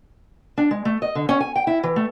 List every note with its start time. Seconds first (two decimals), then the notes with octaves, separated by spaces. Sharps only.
0.58 D4
0.71 G#3
0.85 A3
1.02 D#5
1.15 D3
1.29 C#4
1.40 G#5
1.56 G5
1.67 E4
1.83 E3
1.96 A3